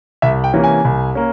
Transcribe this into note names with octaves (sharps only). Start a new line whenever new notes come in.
C2 E5
G5
C3 E3 A#3 C#4
G#5
C2
A#3 C#4